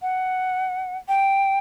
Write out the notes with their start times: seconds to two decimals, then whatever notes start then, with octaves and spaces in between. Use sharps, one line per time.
0.02 F#5
1.08 G5